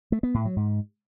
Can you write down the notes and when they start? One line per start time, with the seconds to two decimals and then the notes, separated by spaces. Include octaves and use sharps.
0.12 A3
0.23 B3
0.34 A2
0.45 F#3
0.56 G#2